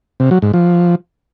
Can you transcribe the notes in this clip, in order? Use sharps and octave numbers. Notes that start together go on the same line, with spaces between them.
C3
F#3
G#2
F3